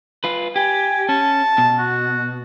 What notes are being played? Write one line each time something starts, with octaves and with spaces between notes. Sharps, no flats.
F4 B4
G4 G#5
C#4 A5
B2
F#4